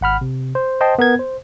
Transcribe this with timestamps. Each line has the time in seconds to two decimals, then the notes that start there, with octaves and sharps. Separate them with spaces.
0.01 G#1 F#5 B5 F6
0.21 C3
0.55 C5
0.81 C5 D#5 G5 A5 C6
0.99 B3 A#4 G#6
1.19 C5